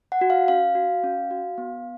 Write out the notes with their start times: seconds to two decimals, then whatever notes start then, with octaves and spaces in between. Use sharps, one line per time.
0.12 F#5
0.21 F#4
0.30 F5
0.48 C#4 F5
0.75 F#4
1.04 C#4
1.31 F#4
1.58 B3